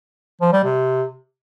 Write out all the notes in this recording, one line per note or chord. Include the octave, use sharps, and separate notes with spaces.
F3
G3
C3